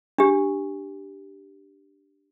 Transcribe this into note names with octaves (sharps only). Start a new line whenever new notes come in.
D4 G4